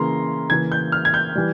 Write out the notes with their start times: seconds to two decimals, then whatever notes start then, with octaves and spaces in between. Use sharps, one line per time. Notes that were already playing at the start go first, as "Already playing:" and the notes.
Already playing: C#3 E3 A#3 A#5 C6
0.50 C#3 E3 A#3 G#6
0.72 G6
0.92 F6
1.05 G#6
1.14 G6
1.35 E3 G3